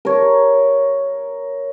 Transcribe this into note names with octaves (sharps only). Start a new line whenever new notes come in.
A#4 C#5